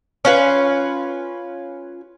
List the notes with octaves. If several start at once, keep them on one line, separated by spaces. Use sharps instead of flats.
C#4 F4 B4